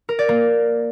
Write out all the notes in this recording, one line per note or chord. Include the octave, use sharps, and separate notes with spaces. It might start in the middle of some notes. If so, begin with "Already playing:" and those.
A#4
D5
A#3